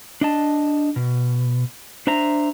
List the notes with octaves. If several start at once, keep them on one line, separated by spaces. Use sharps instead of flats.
D4 D#5 A5
B2
D4 C5 E5 A#5